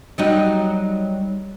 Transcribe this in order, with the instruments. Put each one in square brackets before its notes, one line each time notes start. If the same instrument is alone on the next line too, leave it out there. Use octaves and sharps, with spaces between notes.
[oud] F#3 G3 D#4